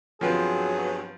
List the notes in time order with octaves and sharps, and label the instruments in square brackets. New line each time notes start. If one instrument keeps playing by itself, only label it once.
[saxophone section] G2 B2 F#3 [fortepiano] F3 C4 B4 [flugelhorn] G#4